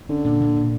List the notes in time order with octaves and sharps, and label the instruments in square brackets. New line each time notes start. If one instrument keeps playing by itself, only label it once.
[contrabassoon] D3 [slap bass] C#4
[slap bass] A#2
A#2
A#2